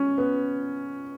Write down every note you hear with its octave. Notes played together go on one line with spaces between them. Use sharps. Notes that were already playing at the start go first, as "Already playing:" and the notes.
Already playing: C#4
B3